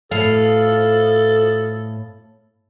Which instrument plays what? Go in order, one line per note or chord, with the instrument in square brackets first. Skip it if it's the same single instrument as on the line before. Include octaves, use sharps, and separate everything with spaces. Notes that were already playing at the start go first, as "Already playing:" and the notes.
[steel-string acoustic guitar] A2 F5 [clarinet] A4